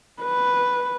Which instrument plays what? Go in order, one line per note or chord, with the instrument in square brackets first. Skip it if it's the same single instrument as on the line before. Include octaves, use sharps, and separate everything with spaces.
[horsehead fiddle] B4